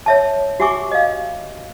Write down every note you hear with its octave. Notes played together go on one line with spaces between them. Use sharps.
C#5 E5 A5
F#4 G4 E5 G#5 C#6 D6
D#5 F5